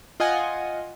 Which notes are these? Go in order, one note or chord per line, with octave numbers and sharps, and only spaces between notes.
F4 D#5 F#5 G#5